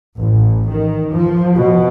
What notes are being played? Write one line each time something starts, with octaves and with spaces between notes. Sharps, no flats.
A1
D#3
F3
B2